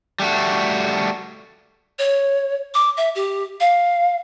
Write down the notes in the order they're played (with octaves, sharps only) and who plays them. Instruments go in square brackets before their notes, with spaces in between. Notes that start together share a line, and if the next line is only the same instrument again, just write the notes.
[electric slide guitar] G3 A3 F#4
[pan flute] C#5
D6
E5
G4
F5